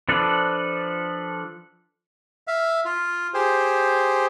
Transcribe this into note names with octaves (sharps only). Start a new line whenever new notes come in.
F3 D4 A4 B4 D5
E5 F5
F4
G4 G#4 C5